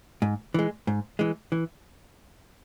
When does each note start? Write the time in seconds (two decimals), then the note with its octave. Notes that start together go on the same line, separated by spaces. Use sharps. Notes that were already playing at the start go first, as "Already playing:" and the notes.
0.22 G#2
0.54 E3 G#3
0.87 G#2
1.19 E3 G#3
1.52 E3